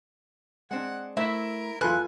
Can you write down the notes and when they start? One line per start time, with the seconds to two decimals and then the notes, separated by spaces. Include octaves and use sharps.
0.71 G#3 C4 D4 F#5
1.17 A3 E4 A#4 C5 E5 F#5
1.81 E2 F#3 F4 A4 B4 G#5 C6 F#6